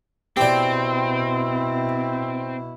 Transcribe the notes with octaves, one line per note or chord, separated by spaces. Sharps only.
B2 C4 E4 G4 D5